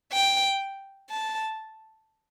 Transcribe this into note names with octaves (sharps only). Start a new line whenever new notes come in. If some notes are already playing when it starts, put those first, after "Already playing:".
G5
A5